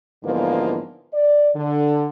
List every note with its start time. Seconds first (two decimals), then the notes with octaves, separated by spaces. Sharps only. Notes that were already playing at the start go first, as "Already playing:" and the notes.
0.24 G#2 D3 E3 F3 A#3 B3
1.14 D5
1.55 D3